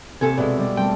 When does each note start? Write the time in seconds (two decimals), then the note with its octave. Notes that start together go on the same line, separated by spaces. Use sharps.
0.21 D#2 C3 A4 G#5
0.38 B2 G#3 D5 E5
0.58 G3 D5
0.77 G3 A3 C4 G5